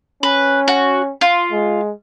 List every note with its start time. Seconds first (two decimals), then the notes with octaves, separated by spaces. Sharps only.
0.23 C#4 B4
0.68 F#4
1.21 F4
1.52 G#3